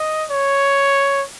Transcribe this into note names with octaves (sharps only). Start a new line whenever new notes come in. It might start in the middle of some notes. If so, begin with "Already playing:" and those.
Already playing: D#5
C#5